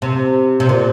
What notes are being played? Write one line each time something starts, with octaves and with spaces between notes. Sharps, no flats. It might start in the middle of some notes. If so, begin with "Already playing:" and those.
C3
C3
A#2